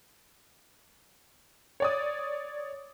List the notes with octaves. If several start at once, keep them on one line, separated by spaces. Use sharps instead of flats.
C#5 D5 D#6